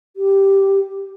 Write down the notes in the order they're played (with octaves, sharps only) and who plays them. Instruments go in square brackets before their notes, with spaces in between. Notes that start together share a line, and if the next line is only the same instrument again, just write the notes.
[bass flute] G4